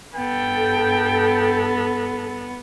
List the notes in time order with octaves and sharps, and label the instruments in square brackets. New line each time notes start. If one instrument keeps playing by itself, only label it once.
[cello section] G2 A4 [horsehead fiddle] B3 [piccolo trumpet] G5